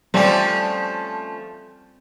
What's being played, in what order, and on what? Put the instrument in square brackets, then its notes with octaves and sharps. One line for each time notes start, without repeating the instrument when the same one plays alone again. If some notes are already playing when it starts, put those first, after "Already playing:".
[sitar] F3 A3 C#4 [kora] G3 C4